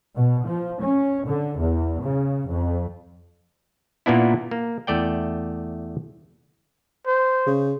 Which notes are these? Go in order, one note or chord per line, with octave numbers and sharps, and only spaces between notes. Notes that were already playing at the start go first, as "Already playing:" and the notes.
B2
F3
C#4
D3
E2
C#3
F2
A#2 A#3 B3 D4 E4
A#3
E2 A3 D5 G5
C5
C#3